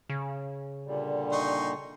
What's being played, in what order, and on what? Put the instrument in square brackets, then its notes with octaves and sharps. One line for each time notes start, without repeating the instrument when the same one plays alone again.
[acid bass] C#3
[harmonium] A#2 D3 G3
[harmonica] D#4 C6 C#6